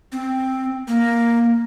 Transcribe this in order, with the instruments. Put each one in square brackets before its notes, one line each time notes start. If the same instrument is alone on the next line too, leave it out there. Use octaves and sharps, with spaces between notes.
[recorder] C4
A#3